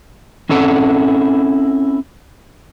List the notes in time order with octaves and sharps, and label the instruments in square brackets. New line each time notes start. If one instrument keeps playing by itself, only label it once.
[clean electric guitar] C4 C#4 E4 A4 F#5